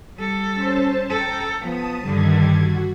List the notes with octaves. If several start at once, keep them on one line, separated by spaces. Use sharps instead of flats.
G3 A4
C#4 C5 A5
A4 G5 A#5
F3 B3 A5 D#6
G2 D3 D#3 G3 G#6
F#4